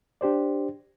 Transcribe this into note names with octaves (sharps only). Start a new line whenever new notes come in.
D4 G4 C5 D5